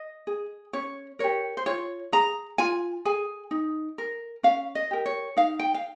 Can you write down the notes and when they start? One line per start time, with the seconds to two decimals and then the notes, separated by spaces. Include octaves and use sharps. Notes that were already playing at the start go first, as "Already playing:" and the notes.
Already playing: D#5
0.27 G#4
0.73 C#4 C#5
1.19 G4 A#4 C#5
1.57 C5
1.66 F4 C#5
2.12 G#4 A#5
2.58 F4 G#5
3.05 G#4 G#5
3.51 D#4
3.98 A#4
4.43 C#4 F5
4.75 D#5
4.91 G4 A#4
5.06 C#5
5.37 D#4 F5
5.59 G5
5.74 F5